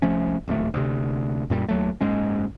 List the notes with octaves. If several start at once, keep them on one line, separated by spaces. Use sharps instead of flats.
C2 F3 A3 C#4
D1 A#1 D#2 A3
D2 C3
F#2 A#2 G3
D#2 F#3 A3
F#1 G#2 G#3 C#4